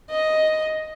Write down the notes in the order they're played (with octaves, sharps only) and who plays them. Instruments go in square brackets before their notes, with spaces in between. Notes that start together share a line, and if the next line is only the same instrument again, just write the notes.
[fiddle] D#5